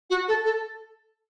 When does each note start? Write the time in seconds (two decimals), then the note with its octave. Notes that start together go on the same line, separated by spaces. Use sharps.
0.10 F#4
0.28 A4
0.45 A4